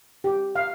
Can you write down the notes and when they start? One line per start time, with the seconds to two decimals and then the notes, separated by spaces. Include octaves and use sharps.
0.24 G4
0.55 F5